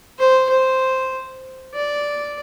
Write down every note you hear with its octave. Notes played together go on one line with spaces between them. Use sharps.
C5
C5
D5